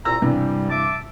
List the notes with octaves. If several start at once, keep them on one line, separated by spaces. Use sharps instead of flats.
C2 A#2 A#5 E6
G2 C3 E3 G3
E5 A5 D6